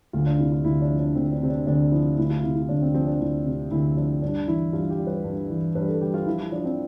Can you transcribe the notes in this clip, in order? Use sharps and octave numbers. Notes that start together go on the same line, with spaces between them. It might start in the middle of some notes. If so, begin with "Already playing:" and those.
D2 F4
D4
C3 E4
F4
D2 E4
D4
F3
D4
D2 C4
D4
C3 C4
D4
D2 D4
F3 E4
D2 E4
F4
C3 E4
E4
D2 D4
C4
F3 C4
D4
D2 E4
C3
D2 E4
F3 D4
G2 D4
E3 E4
G2 F4
G4
G3
B4
G2
E3
G2 B4
A4
G3 G4
F4
F3 E4
E4
F3 D4
C4